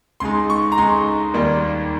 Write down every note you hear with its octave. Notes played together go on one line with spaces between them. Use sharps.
C#2 C#3 G#3 D#4 C6
C#6
A#5
C#2 C#3 G#3 D#4 C6
D#2 D#3 G3 A#3